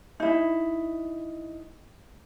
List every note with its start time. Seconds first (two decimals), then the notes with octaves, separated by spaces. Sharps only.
0.20 D#4 E4